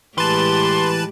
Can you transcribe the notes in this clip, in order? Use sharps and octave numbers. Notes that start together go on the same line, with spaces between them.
A2 E3 G#3 G4 B4 A5 C6